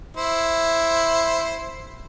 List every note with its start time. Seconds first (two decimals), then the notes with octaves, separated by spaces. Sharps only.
0.17 E4 C5